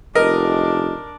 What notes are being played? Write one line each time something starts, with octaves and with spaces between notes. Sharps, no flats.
F1 D4 A#4 D#5